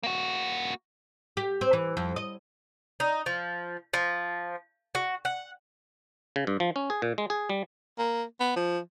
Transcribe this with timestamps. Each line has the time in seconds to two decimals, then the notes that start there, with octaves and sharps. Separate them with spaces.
0.03 A#3 F#4
1.37 G4
1.61 C4
1.73 E3
1.97 F2
2.16 D#5
3.00 D#4
3.26 F3
3.93 F3
4.95 F#4
5.25 F#5
6.36 C#3
6.47 G2
6.60 F3
6.76 C#4
6.90 G#4
7.02 A#2
7.18 G#3
7.30 G#4
7.50 G3
7.99 A#3
8.40 B3
8.56 F3